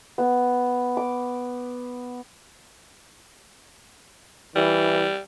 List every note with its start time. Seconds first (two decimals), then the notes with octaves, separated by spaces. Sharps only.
0.18 B3
0.97 D6
4.56 E3 G3